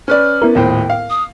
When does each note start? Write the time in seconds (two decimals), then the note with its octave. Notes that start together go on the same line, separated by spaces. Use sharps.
0.08 C#4 B4 D5 F6
0.42 B3 E4 A#4
0.55 D#1 A2 C5 G5
0.90 F5
1.10 D#6